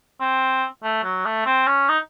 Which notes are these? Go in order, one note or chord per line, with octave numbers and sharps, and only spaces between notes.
C4
A3
F#3
A3
C4
C#4
D#4